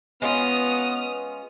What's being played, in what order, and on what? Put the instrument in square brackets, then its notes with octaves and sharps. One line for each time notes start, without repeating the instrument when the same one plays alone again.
[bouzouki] G#3 C#4 F4 [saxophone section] B3 [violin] D#6 F6